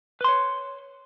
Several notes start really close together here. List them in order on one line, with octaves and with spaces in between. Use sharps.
B4 C6 C#5